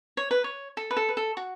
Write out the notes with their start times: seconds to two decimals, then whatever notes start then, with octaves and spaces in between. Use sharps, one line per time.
0.17 C#5
0.31 B4
0.44 C#5
0.77 A4
0.91 B4
0.97 A4
1.09 B4
1.17 A4
1.37 F#4